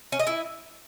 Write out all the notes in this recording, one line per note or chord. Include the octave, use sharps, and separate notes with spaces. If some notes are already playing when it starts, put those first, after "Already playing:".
C#4
D#5
E4